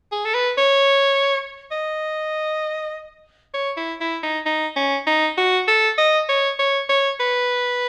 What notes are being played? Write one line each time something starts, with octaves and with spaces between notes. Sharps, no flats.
G#4
A4
B4
C#5
D#5
C#5
E4
E4
D#4
D#4
C#4
D#4
F#4
A4
D#5
C#5
C#5
C#5
B4